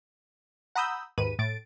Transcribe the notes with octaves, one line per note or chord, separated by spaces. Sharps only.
F#5 A#5 B5 D#6 E6 G6
D#2 G#2 B4 D#7
A2 A6 D7